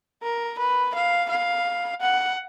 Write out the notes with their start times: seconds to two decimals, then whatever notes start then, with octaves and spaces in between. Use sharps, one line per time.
0.23 A#4
0.59 B4
0.95 F5
1.29 F5
2.01 F#5